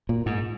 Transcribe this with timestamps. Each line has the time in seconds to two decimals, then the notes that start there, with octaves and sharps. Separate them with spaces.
0.09 A#2
0.26 G#2